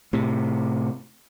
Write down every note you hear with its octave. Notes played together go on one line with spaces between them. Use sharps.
A2 C3